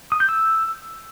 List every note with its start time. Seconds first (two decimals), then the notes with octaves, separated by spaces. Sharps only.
0.12 D#6
0.20 G6
0.29 E6